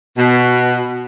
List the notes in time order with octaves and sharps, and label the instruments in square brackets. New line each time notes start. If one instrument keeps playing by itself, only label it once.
[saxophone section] B2